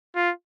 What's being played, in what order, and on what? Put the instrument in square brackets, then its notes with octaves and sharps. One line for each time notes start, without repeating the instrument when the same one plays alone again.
[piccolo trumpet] F4